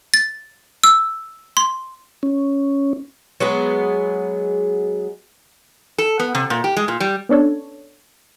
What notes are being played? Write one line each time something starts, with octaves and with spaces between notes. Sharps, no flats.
A6
E6
C6
C#4
F#3 G#3 B3 G#4
A4
B3
C3
A#2
G4
G#3
A#2
G3
B3 C#4 D4 A4 C#5